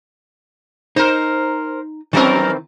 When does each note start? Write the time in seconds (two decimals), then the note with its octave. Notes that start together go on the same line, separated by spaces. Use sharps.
0.96 D#4 A#4 C5
2.13 D#3 E3 F#3 C4 C#4 A#4